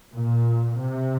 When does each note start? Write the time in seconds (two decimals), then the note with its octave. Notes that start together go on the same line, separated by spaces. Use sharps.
0.14 A#2
0.78 C3